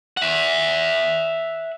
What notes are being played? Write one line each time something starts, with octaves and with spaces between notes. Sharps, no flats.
E5 F#5